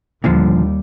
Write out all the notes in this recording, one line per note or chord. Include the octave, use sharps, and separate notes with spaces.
D#2 A#2 D3 F3 G3